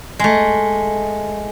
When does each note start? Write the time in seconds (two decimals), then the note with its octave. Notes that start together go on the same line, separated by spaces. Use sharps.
0.19 G#3 A3